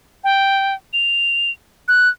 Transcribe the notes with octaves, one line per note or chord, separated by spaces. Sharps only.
G5
F7
F#6